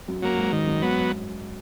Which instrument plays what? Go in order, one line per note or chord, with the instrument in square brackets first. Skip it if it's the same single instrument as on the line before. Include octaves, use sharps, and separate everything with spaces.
[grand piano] F#2
[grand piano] F#2 [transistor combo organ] F#3 A#3
[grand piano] G#2
[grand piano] G#2 [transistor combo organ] D#3
[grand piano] F#2
[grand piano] G#2 [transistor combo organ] F#3 B3